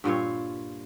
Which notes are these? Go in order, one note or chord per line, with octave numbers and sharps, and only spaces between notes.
G2 A#2 F4 C#5